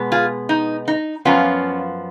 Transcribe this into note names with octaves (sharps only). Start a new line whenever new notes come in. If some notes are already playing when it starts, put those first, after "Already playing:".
Already playing: B2 G#3 B3
F4 G#4
D#4
D#4
F#2 F3 B3 C#4 F4